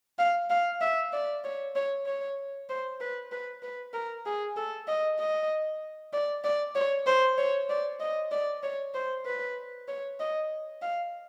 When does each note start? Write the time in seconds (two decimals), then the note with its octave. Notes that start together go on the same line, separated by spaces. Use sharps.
0.19 F5
0.50 F5
0.81 E5
1.13 D5
1.44 C#5
1.75 C#5
2.06 C#5
2.69 C5
3.00 B4
3.32 B4
3.63 B4
3.94 A#4
4.26 G#4
4.57 A4
4.88 D#5
5.19 D#5
6.13 D5
6.44 D5
6.75 C#5
7.06 C5
7.38 C#5
7.69 D5
8.00 D#5
8.32 D5
8.63 C#5
8.94 C5
9.26 B4
9.88 C#5
10.20 D#5
10.82 F5